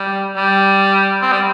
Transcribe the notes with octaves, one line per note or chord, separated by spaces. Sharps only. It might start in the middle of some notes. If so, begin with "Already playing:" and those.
Already playing: G3
G3
C4
G3